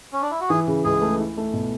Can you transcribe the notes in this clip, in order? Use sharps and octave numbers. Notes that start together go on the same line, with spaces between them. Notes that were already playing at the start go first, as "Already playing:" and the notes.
C#4
D4
E4
F#4
E3 G#4
C#3
C#2 G#4
A3
E4
A3
B2